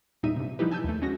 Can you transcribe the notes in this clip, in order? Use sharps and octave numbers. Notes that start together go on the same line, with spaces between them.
E2 A#2 G3 D#4 E5 D#7
G2 C3
F3 G3 D#4 E4 G4 B4
G#5 A5 E6 G6
D#2 A3
G#3 C#4 F#4 A#6